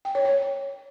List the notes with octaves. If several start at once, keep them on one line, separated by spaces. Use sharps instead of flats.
G5
C#5
C#5